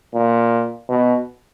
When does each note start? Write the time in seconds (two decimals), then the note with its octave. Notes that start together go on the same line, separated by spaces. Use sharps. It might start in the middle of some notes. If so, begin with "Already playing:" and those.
0.15 A#2
0.89 B2